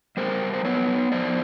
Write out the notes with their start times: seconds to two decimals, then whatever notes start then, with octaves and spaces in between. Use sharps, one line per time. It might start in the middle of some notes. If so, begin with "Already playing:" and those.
0.17 G3 A#4 C5
0.53 C5
0.65 B3 B4 C#5
1.12 F2 C5 D5